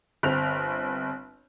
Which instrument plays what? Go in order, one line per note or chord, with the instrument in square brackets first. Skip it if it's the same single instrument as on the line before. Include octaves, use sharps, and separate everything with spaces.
[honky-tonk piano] G1 C4 F7